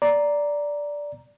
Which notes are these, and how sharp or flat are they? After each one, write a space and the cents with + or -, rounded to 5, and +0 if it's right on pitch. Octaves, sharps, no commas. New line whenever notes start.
D5 -5 A#5 +0